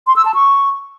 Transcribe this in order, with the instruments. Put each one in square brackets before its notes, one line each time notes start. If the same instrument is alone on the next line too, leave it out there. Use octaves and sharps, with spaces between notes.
[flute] C6
E6
A5
C#6